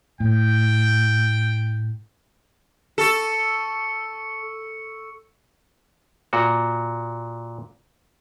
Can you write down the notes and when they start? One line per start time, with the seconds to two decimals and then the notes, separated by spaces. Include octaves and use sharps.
0.20 A2 G5
2.98 A4 C#6 E6 C#7
6.33 A#2 F#4